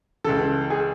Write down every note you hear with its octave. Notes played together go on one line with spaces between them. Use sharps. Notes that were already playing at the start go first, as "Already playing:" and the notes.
C#2 C#3 E3 A4
G#4